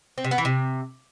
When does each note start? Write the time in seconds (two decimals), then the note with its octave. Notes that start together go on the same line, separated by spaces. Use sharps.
0.18 C4
0.24 C3
0.31 B3
0.38 E3
0.45 C3